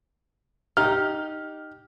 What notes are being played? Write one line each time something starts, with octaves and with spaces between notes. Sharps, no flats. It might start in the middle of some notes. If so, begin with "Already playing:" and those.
D#4 G4 F6